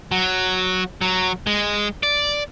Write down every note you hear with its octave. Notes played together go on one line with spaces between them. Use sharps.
F#3
F#3
G#3
D5